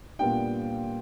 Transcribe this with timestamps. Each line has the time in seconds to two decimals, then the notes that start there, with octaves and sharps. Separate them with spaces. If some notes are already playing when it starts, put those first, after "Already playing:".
0.19 A#2 G3 B3 D4 G5